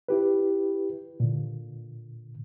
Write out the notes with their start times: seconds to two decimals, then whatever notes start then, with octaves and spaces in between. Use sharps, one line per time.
0.09 E4 G4 B4
1.20 A#2 D3